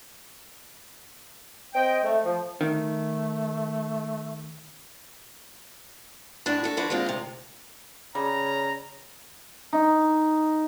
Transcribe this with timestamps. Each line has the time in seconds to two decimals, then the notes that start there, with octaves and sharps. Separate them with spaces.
1.74 C4 D#5 G5
2.04 A3
2.24 F3
2.61 D#3 A3
6.46 A2 G#3 D4 F#4
6.64 F#4 A4
6.77 D3 F3 D4 F#4 B4
6.90 G#3 A#3 C4 F4
7.06 D2 C3
8.15 C#3 G3 C#5 A#5
9.73 D#4